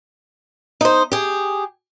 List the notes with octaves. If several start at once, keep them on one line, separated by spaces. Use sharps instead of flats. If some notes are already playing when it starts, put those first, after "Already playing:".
D#4 C5
G4 G#4